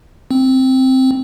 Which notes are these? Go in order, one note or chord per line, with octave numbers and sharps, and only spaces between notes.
C4